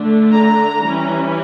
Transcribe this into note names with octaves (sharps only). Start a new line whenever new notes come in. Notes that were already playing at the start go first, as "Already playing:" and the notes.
Already playing: D3 A3 D4
A#5
E3 G3 C#4